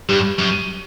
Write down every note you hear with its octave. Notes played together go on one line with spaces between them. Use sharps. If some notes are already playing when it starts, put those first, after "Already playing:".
G2 G4
F#2